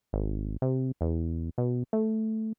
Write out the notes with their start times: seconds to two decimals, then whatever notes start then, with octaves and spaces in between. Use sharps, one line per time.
0.13 G#1
0.62 C3
1.01 E2
1.58 B2
1.93 A3